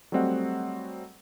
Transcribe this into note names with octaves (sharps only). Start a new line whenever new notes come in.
F#3 G3 A3 C4 D#5 F#5